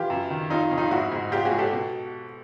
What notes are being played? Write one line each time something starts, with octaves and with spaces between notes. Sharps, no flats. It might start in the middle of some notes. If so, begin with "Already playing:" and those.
Already playing: E3 F4 G4
F#2
D#3
F2 D#4 F4
F2
D#4 F4
G#2 E4 F#4
G#2
G#2 F4 G4
F#4 G#4
G#2
G4 A4
B2